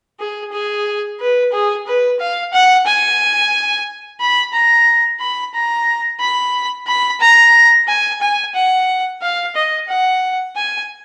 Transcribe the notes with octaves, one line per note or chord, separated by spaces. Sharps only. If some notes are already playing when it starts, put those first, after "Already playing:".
G#4
G#4
B4
G#4
B4
F5
F#5
G#5
B5
A#5
B5
A#5
B5
B5
A#5
G#5
G#5
F#5
F5
D#5
F#5
G#5